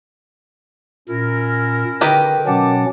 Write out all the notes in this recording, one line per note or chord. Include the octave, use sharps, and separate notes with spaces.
A#2 C#4 E4 A#4
D3 D#3 G4 B4
B2 F#3 C#4 F#5 A5 D6